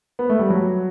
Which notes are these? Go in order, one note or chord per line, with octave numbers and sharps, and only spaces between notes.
B3
A3
G3
F#3